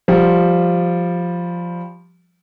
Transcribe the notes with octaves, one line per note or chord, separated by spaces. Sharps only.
F3 G3